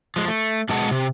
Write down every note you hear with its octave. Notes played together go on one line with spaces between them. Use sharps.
F3 G#3
A3
B2 D3 G#3 G#4 F#5 A5
C3